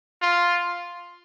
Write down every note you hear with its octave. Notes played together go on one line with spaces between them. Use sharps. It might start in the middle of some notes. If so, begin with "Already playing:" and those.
F4